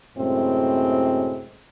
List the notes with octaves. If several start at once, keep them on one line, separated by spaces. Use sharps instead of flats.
F#2 A2 C3 G#3 C4